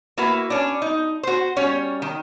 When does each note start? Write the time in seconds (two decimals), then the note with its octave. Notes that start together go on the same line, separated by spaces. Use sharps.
0.18 A#3 E4 F#4 B4
0.50 C#4 D4
0.82 D#4
1.23 F#4 C5
1.57 G3 C#4 C#5
2.02 D#3